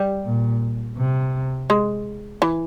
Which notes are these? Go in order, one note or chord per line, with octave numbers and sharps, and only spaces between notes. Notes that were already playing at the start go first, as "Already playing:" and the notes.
Already playing: G3
A#2
C3
G#3
E3